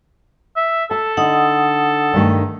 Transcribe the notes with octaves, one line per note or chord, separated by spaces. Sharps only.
E5
A4 A5
D3 D#4 F#5 D#6
G2 D#3 A3